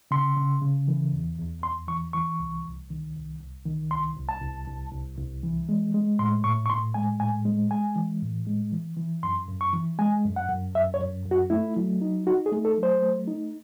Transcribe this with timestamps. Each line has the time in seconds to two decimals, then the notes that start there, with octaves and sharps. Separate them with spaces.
0.11 C#3 C6
0.37 C#3
0.62 C#3
0.88 E3
1.12 E2
1.38 E2
1.63 E2 C6
1.88 E3 C#6
2.13 E3 C#6
2.39 C2
2.65 C2
2.90 D#3
3.16 C2
3.40 C2
3.65 D#3
3.91 C2 C6
4.16 C2
4.29 A5
4.41 C2
4.68 C2
4.92 C2
5.18 C2
5.43 E3
5.69 G#3
5.94 G#3
6.19 A2 C6
6.44 A2 C#6
6.66 C#6
6.69 A2 C6
6.94 G#3 G#5
7.20 A2 G#5
7.45 G#3
7.71 G#3 G#5
7.96 E3
8.22 A2
8.47 G#3
8.72 E3
8.97 E3
9.23 F#2 C6
9.48 F#2
9.61 C#6
9.73 E3
9.99 G#3 G#5
10.24 F#2
10.36 F#5
10.49 F#2
10.75 F#2 E5
10.94 C#5
11.00 F#2
11.26 F#2
11.31 F#4
11.50 A3 E4
11.77 F#3
12.01 D#4
12.27 D#4 F#4
12.46 G#4
12.52 A3
12.65 A4
12.78 F#3
12.83 C5
13.02 A3
13.27 D#4